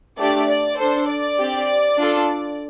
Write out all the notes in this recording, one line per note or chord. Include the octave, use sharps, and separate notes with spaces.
A3 D4 G4 D5
D5
D4 A4 C5
D5
C4 G4
D4 F4 A4